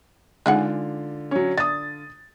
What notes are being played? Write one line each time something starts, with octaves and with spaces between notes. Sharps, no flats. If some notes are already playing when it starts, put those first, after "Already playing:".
D3 G#3 C#4 D#4 F4 G#4 D5 F#5
F#3 C#4
D4 D#6 A6